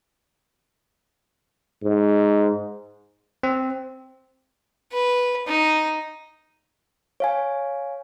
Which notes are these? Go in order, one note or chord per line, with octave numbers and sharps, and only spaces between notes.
G#2
C4
B4
D#4
C#5 F5 G#5